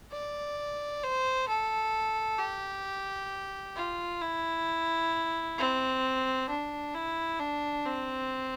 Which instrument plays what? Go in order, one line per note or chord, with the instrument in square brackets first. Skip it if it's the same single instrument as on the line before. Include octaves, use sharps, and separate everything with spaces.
[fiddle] D5
C5
A4
G4
F4
E4
C4
D4
E4
D4
C4